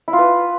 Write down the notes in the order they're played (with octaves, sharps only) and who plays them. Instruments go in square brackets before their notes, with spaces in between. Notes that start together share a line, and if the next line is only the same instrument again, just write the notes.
[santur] E4
F4
B4